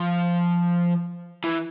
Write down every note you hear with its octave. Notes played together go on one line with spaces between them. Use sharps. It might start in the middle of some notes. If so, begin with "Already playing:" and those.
Already playing: F3
E3